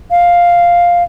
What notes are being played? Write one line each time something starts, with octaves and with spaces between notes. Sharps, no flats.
F5